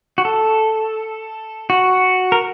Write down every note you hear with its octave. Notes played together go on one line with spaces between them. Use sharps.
F#4
A4
F#4
A#4